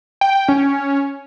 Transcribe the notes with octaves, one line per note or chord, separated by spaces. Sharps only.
G5
C#4